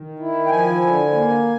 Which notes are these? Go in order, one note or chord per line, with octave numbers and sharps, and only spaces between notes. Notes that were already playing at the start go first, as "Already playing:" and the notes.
Already playing: D#3
E4
G5
F3 G#5
D3
A#3